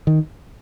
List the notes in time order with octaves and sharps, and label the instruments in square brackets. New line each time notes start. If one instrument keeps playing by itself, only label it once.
[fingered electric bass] D#3